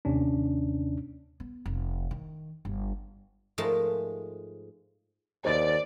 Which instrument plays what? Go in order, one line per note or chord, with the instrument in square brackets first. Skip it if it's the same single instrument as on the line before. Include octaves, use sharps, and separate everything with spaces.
[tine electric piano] D#2 C3 C#4 D4
[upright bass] B3
F1
D#3
G1
[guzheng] G#2 F3 G#3 A3 A#4 A5
[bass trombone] D#2 [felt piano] C5 D#5 A6 [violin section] D5